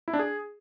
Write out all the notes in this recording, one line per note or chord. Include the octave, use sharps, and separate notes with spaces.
E4
D4
G#4